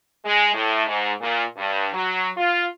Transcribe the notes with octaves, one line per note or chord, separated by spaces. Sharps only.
G#3
A2
G#2
A#2
G2
F#3
F4